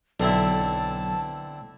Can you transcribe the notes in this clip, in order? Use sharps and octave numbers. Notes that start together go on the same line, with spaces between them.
B1 D3 C4 E4 A5